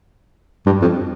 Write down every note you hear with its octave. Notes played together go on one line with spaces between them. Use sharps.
G2
F2